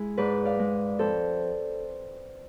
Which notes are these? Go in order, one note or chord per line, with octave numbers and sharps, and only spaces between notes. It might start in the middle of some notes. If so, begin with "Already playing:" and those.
Already playing: G#3 E4 G#4
G#2 B4 D5
D5 F5
G#3
F2 A4 C5